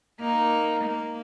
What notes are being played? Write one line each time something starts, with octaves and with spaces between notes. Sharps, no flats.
A#3 D#4
A#3